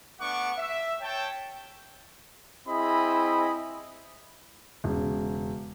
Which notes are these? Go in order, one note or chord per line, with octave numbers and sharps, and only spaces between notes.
A3 B3 D4 F#5 C#6 D6
E5
C#5 G5 A5
C4 E4 G#4 D#5 E5 B5
E1 C#3